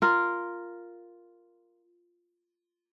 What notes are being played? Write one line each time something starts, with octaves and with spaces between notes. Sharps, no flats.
F4 A#4